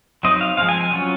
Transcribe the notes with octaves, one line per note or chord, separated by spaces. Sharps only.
F#3 C4 D#4 D#5
F5
F3 G#3 C4 F5
G#5
G#5
F#3 C#4 F4